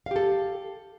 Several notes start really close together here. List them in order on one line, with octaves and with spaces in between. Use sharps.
F5 G4 A4